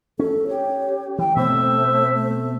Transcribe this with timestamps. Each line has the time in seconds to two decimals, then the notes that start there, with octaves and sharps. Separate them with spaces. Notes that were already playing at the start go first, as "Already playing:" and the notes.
0.19 C#4 A4
0.47 G4 C#5
1.18 E3 G5
1.36 B2 A3 C4 C5 E5
2.14 A3